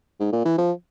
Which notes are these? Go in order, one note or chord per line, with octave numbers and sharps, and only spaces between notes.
G#2
A#2
E3
F3